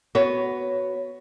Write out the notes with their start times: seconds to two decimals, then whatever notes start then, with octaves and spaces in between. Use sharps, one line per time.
0.15 B3 F#4 C#5